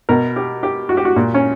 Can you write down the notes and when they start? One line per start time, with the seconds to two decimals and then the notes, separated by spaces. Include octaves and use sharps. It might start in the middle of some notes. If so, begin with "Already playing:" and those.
0.09 B2 A#4
0.36 G4
0.63 G4
0.89 F#4
0.97 G4
1.05 F#4
1.16 A#2
1.34 C#4